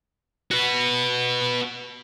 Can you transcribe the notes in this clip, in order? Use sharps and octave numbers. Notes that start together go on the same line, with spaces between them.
F#4 B4